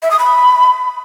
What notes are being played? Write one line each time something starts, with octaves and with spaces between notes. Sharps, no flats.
E5
D#6
B5